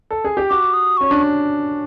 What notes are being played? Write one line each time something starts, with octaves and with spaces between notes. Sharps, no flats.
A4
G#4
G4
F#4 D6
D#6
C#4 C#6
D4